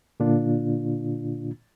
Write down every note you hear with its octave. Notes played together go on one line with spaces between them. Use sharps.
A#2 D3 A#3 D4 F4